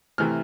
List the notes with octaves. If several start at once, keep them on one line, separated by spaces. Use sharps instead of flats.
C3 E3 A3 F6